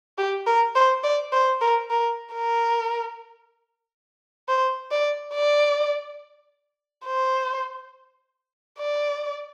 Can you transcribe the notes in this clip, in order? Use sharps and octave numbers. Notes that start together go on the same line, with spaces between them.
G4
A#4
C5
D5
C5
A#4
A#4
A#4
C5
D5
D5
C5
D5